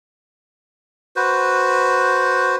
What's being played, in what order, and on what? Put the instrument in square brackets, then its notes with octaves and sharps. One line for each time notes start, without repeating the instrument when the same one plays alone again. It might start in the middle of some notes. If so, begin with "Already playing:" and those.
[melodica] F#4 B4 C5